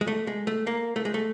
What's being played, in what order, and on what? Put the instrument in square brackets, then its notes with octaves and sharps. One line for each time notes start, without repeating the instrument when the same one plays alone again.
[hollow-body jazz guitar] G#3
A3
G#3
A3
A#3
A3
G#3
A3